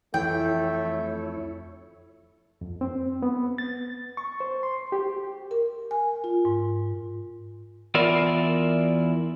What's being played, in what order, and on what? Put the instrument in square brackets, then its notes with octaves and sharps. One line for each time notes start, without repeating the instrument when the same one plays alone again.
[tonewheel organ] F2 E4 C#5 [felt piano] E3 [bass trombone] A3 [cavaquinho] G5
[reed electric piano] F2
C4
B3
A6
C#6
C5
C6
G4
[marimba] A#4
G#5
F4
G#2
[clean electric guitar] E2 E4 F4 A#4 D5